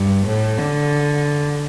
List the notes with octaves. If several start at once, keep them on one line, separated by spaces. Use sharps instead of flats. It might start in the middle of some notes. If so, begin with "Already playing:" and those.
Already playing: G2
A2
D3